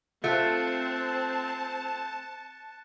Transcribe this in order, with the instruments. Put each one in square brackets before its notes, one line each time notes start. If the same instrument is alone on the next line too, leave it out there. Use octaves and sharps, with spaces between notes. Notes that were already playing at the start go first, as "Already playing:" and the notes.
[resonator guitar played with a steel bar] A3 F4 [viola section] C4 [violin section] A5 [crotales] F#6 A6 C#7